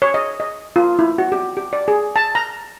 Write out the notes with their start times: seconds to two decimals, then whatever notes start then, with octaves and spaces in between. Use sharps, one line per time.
0.02 C#5
0.14 D#5
0.40 D#5
0.76 F4
0.99 E4
1.18 F#4
1.32 G4
1.57 G4
1.73 D5
1.88 G#4
2.16 A5
2.35 A#5